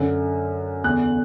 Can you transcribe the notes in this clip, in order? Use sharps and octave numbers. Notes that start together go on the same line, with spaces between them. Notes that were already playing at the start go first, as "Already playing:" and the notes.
Already playing: F#2 D3
E2 D3 F#6